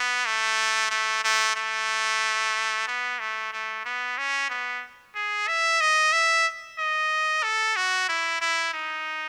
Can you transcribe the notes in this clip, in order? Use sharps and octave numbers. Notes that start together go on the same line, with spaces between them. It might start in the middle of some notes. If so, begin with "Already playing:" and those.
Already playing: B3
A3
A3
A3
A3
B3
A3
A3
B3
C#4
B3
G#4
E5
D#5
E5
D#5
A4
F#4
E4
E4
D#4